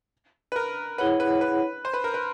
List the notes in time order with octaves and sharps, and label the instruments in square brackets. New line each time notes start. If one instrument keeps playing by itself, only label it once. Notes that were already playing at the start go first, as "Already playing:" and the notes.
[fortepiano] B4
A#4
[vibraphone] E4 G#4 C#5 F#5 [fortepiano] B4
[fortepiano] B4
B4
C5
B4
A#4
B4